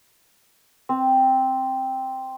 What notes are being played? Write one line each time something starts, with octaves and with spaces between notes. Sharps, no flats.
C4